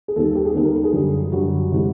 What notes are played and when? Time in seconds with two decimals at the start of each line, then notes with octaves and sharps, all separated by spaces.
0.08 G#4
0.16 D#2 D#3 G3 B3 A4
0.35 G4
0.45 G#4
0.55 D#2 D#3 G3 B3 A4
0.65 A#4
0.74 A4
0.84 G#4
0.93 F#2 D3 G3
1.32 F#2 D3 G3 F#4
1.72 C3 E3 G#3